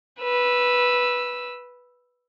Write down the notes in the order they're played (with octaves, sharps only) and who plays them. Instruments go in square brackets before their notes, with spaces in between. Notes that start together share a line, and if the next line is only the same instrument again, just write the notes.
[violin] B4 E6